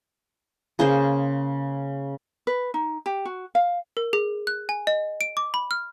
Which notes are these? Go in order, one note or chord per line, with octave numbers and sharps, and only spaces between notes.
C#3 A#3 G#4 C5
B4
D#4
G4
F#4
F5
A#4
G#4
F#6
G#5
D#5
D7
D6
B5
F6